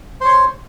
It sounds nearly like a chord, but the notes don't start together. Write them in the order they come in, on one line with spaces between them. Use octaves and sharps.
C5 C#5 C6